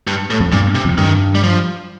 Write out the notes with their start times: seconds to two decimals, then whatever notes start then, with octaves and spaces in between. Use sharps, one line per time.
0.07 G2
0.30 A2
0.40 F2
0.52 G2 A#2
0.75 C3
0.85 F2
0.98 G2 D#3
1.35 G3
1.43 F3